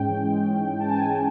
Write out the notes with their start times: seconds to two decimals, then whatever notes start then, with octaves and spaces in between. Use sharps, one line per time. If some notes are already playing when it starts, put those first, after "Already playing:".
Already playing: G#2 G#3 C#4 G5
0.08 E3
0.25 G#3
0.41 C#4
0.58 G#2
0.74 E3
0.80 A5
0.90 G#3 G#5
1.07 C#4